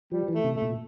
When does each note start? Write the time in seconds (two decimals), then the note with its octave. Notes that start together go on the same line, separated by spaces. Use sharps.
0.12 F3 G3
0.28 E3
0.35 A3
0.44 C3
0.56 A3
0.62 A#2